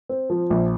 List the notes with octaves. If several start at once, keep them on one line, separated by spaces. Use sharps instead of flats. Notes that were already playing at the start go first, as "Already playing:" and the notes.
C4
F3
A#1